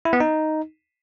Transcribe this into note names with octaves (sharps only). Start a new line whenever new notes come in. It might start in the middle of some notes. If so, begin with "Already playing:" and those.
E4
B3
D#4